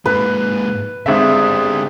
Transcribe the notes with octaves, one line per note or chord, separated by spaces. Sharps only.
G#2 A#3 B4
G#1 D3 G3 G#4 E5